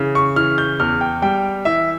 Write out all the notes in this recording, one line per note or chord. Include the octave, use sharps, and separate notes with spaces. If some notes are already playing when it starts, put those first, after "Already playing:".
Already playing: C#3 E3
C#6
E3 F6
G6
E2 F6
G5
G3 G5
E3 E5